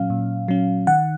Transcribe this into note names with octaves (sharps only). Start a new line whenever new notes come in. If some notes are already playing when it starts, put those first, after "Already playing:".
Already playing: A#2 F#3 C#4 F5
A#2
F#3 C#4
D#3 F#5